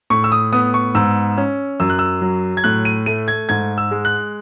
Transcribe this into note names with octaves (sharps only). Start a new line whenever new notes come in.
A2 C#6
E6
D#6
B3 D#6
C#6
G#2 E6
C#4
F#2 E6
F#6
E6
F#3
G#6
A2 F#6
D#7
A3 D#7
G#6
G#2 G#6
E6
G#3
F#6